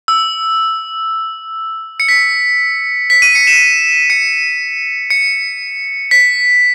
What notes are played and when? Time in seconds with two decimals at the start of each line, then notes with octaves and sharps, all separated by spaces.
0.08 E6
2.00 C#7
2.09 B6
3.10 B6
3.22 D#7
3.35 C#7
3.47 E7
4.10 C#7
5.10 C#7
6.11 B6